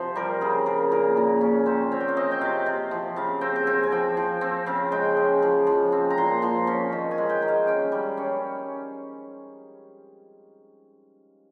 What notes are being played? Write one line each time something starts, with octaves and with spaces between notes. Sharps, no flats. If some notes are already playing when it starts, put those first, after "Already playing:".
Already playing: C3 F3 C5
G3 A#4
C#3 G#4
C#3 A#4
A#2 A#4
A#2
C#4
C4 C5
C4 C#5
G5
F5
C4 D#5
G5
C3 F5
C3
F3
C#3 F5
C4 G5
G5
C4 G#5
G#5
F3 G5
F3
C4
C#3 F5
G#3 G5
C#4
F3
F3
C4
A#5
A#2 C6
F3 C6
C#4 C#6
D#3
G#5
G#3
G5
D#3
F5
C#4 G5
G3
C#4